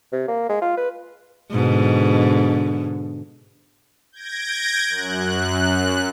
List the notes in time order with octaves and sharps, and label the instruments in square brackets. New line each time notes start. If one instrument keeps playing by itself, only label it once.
[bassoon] C3
A#3
G#3
F4
B4
[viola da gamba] G#2 B2 D3
[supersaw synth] G6 G#6 A#6 D7
F#2 F#6